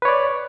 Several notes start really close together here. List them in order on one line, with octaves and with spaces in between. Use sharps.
B4 C#5 D5